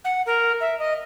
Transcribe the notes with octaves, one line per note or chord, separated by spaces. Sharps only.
F#5
A#4
E5
D#5